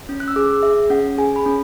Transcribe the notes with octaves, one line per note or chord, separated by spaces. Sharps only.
C#4
F#6
E6
G#4 D6
G#4 E5
C#4 F#5
G#4 G#5
B5
C#4